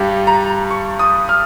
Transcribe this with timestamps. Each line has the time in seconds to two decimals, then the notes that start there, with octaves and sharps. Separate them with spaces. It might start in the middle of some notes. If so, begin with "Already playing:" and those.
Already playing: G2 G3
0.27 A#5
0.71 C#6
0.99 D#6
1.29 F6